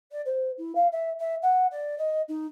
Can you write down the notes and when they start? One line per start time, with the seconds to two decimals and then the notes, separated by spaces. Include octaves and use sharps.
0.11 D5
0.25 C5
0.57 E4
0.75 F5
0.92 E5
1.20 E5
1.42 F#5
1.71 D5
1.98 D#5
2.28 D#4